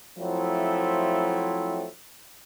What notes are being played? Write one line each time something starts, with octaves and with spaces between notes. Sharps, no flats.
F3 F#3 A3 C4 E4